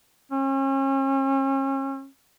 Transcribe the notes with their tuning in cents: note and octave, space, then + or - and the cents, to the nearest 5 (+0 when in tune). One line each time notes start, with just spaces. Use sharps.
C#4 -35